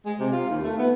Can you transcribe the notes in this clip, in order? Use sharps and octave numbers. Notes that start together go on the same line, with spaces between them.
G#3
C3
F4
D#2
A3
B3